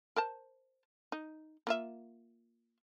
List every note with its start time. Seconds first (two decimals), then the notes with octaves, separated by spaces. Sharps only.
0.16 A#4 C5 A5
1.12 D#4
1.67 A#3 F4 E5